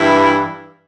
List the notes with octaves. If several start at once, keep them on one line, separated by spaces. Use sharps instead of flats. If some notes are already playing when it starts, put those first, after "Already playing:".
Already playing: G2 E3 G3 E4